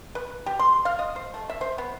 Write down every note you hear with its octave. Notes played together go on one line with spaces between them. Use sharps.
B4
G4
C6
F5
D#5
C5
A3
E5
C5
B3